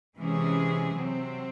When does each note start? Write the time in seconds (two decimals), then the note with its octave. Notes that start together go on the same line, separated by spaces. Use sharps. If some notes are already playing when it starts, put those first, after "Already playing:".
0.19 C3 E3 G#3 C#4 G#4
0.96 C3 F#3 C4